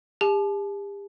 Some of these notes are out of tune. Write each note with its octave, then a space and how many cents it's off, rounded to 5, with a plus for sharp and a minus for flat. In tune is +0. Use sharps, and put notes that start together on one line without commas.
G4 +40 A5 -40